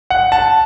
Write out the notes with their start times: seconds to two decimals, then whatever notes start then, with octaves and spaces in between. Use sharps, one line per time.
0.10 F#5
0.32 A5